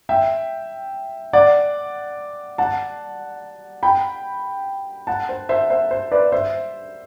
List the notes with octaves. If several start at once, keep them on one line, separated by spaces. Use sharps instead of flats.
E5 G5
D5 F#5
F#5 A5
G5 B5
F#5 A5
C5
C5 E5
C5 E5
C5
B4 D5
C5 E5